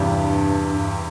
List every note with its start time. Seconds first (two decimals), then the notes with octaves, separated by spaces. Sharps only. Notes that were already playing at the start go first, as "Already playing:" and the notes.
Already playing: E2 G2 C3 G3
0.71 G2